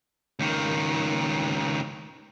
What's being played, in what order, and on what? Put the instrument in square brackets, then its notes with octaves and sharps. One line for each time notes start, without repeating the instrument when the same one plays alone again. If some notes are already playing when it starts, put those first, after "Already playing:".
[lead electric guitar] C#2 D#3